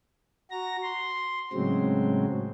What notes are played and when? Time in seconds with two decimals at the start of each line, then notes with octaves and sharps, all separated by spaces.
0.51 F#4 A#5 A#6
0.82 C6
1.53 A2 C#3 F#3 G#3 C4